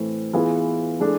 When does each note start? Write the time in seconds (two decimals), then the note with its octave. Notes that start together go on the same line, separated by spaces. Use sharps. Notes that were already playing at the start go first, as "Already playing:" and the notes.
Already playing: A2 E3 A3 C4
0.33 E3 B3 F4 G#4
1.00 E3 G#3 D4 A4